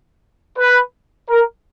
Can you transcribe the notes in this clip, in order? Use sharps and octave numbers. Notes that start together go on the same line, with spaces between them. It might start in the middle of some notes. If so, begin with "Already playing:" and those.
B4
A#4